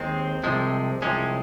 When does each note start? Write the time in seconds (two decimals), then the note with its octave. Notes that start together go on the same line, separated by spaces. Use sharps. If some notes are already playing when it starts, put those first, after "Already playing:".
Already playing: D#2 D#3 G#3 C4
0.44 C2 C3 F3 G#3
1.02 C2 C3 F3 G#3 C#4